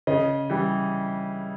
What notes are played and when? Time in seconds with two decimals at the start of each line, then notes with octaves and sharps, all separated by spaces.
0.07 C#3 D#5
0.50 E3 G3